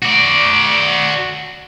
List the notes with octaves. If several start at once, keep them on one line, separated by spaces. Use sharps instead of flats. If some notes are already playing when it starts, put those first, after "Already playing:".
F#4 D5